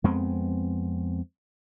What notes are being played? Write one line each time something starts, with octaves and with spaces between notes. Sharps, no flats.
F2 G#3 B3 C4